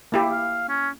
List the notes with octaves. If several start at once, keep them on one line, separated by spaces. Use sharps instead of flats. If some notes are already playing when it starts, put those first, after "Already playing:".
A#3 E4 G4
F5
C#4